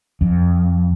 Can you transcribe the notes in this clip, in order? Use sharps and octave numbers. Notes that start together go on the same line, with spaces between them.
F2